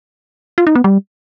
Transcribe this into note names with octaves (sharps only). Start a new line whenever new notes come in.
F4
D#4
B3
G3